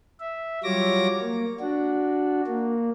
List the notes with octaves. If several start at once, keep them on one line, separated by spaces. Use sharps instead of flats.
E5
F#3 G3 F4 C#5 D6 A#6
A#3
D4 F#4
A#3